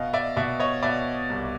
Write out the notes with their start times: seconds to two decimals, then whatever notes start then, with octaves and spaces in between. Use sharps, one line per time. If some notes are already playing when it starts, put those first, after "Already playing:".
Already playing: B2 D#5 F5
0.13 D5 E5
0.37 B2 D5 E5
0.60 C#5 D#5
0.83 B2 D5 E5
1.30 C2